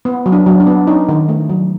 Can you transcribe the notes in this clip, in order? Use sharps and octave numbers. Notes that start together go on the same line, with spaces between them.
B3
F#3
D4
F#3
D4
B3
C#4 D#4
D#3
A3
F#3